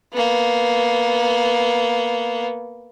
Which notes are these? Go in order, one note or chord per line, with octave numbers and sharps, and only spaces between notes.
A#3 B3